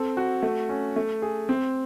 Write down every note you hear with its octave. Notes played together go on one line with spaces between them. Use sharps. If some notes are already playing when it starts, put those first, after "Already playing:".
Already playing: C4 A4
F#4
A3
C#4
A3
G#4
C4